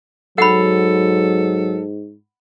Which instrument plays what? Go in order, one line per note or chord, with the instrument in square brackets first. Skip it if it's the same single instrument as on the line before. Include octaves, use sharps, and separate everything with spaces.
[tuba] G#2 [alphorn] F#3 [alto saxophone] A4 [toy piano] F#5 B5